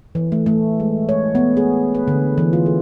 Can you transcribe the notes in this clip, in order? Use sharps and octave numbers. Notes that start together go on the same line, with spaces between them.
E3
A3
A3
G#3
C#5
B3
G#4
B4
D3
E3
F4
G#4